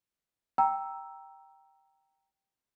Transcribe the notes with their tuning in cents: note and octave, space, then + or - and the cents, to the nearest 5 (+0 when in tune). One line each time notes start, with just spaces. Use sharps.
G5 +0 A#5 +5 E6 +0